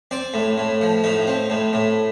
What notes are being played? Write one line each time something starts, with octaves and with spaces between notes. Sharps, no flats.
C4 D5
A2
A2
F3
A2 D#4
C4
A2
A2